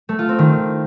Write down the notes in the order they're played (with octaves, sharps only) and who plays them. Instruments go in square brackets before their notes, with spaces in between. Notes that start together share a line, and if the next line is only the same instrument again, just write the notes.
[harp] A3
F4
C4
D#3